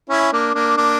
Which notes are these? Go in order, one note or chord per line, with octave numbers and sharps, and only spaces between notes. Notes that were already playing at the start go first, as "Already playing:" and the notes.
C#4 E4
A#3 D4
A#3 D4
A#3 D4